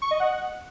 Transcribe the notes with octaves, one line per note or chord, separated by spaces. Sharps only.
C#6
D#5
F#5